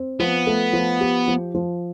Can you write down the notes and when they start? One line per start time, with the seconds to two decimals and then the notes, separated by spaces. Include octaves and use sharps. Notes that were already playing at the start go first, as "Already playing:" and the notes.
Already playing: C4
0.19 F3 B3
0.47 A3
0.73 F3
1.01 G4
1.28 F3
1.55 F3